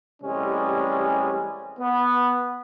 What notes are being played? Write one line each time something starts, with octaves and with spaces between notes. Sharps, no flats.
A1 C3 G3 G#3 C#4
B3